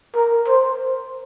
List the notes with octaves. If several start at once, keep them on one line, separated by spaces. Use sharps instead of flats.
A#4
C5